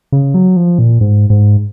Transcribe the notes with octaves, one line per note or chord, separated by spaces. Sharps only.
C#3
F#3
F3
A#2
G#2
G#2